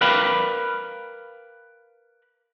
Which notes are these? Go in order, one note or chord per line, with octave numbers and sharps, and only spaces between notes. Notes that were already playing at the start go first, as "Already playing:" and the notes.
A#4 B4 D5 F5 G5 B5